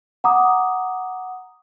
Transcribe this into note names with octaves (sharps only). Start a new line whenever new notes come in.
F#5 A#5 D6 D#6